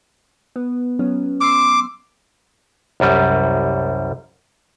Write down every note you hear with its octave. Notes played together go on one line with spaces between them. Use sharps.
B3
F#3 B3 C#4
C6 D6 E6 C7
C2 F#2 G3